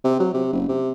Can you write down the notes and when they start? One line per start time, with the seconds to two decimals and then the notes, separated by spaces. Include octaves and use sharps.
0.04 C3
0.20 F#3
0.34 C3
0.53 F#1
0.69 C3